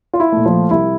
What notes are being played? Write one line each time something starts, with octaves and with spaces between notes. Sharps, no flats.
F4
E4
A#2 A3
F3 F4
C2 E4